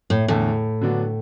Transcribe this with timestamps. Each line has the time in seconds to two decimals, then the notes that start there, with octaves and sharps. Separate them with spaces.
0.10 A2
0.28 E2 A2 D3 A3
0.81 D3 F#3 B3 D4 F#4